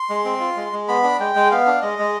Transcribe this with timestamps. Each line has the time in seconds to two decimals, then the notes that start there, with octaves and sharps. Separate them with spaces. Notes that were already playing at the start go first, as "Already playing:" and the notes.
Already playing: C6
0.10 G#3
0.25 C4
0.40 F4
0.56 G#3
0.73 G#3
0.88 B3 B5
1.03 D4
1.20 G#3 G5
1.35 G#3
1.51 B3 F5
1.66 D4
1.82 G#3 D#5
1.99 G#3